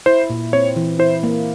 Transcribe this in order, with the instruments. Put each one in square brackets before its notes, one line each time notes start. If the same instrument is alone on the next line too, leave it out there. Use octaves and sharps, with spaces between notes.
[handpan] E4 [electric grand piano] C5
[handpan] A#2
[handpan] C4 [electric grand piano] C#5
[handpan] E3
[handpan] E4 [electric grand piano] C5
[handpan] A#3